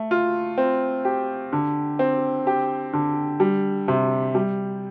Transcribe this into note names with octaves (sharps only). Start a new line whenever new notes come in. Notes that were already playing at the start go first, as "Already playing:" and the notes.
Already playing: A3
F4
C4
G4
D3
C4
G4
D3
G3
C3
G3